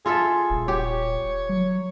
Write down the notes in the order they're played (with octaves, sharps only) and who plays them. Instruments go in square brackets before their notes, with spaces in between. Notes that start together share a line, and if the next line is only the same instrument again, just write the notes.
[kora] F4 A4 E5 [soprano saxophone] G#4
[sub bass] D#1
[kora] G4 [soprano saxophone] C#5
[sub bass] F#3